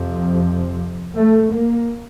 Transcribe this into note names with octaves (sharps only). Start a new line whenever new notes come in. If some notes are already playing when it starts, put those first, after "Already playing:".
Already playing: F2 C3 F3
A3
A#3